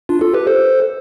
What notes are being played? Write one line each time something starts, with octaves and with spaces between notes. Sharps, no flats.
D4 F4
F4 A4
G4 B4
A4 C5